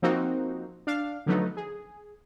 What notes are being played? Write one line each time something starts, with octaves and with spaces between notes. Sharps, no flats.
F3 A#3 C4 D#4 F#4
D4 F5
D3 F3 F#3 A3 B3 D#4
G#4